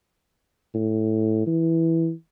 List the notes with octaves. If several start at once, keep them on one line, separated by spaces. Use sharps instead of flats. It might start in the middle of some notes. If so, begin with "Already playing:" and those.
A2
E3